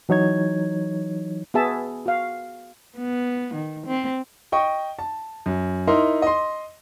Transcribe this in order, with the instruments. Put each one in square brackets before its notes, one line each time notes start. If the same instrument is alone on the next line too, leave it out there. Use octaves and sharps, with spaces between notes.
[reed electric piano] E3 F#3 D#4 C#5 G#6
[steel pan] B3 F#4 G#4 E5 A5
F#4 F5
[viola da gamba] B3
D#3
C4
[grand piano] D#5 G5 C#6
A5
F#2
D#4 E4 A#4 C6
D#5 C6